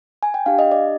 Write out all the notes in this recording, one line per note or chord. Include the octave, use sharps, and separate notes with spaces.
G#5
G5
D4 G4 F5
D#5
D5